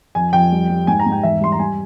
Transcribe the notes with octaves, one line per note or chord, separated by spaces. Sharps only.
F2 G#5
F2 G5
G3
G3
G#2 G#5
A#5
G#2
G5
E2 E5
G3 C6
A#5
G3 G#5